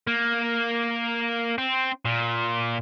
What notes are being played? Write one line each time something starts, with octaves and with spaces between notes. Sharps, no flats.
A#3
C4
A#2